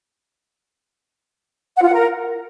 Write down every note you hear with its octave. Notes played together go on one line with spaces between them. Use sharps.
F#5
F4
F#5
A#4